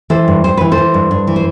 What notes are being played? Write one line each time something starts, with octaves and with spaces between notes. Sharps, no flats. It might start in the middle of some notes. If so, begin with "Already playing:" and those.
E3 A4 C5
G2
G2 C5
E3 B4
A4 C5
E3
G2
G2
E3
C5